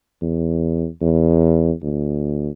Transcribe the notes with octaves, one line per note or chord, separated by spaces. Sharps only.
E2
E2
D2